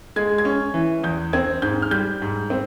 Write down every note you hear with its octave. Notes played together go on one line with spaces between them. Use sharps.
G#3 G#6
G#6
C#4
E3
E2 G6
C4 G#6
G#2 G6
F6
G3 G6
G#2
C4